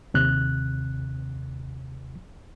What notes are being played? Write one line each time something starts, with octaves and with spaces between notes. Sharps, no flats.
D#2 C3 F#6